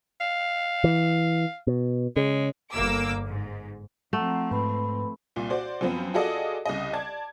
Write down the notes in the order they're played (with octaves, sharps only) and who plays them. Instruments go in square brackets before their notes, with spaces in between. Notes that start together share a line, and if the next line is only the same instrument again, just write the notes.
[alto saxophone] F5
[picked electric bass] E3
B2
[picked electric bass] C#3 [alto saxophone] G#3
[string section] G1 A#3 D6 E6
G#2
[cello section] F3 C4 [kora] A3 [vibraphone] F#5 A#5
[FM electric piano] G#2 [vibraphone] B4 B5
[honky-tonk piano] C2 A#2
F#4 C5 D5
F#2 F3 B3 C4
F4 F#4 G#4 A4 D5 D#5
C2 C#3 D#5
D5 A5 G#6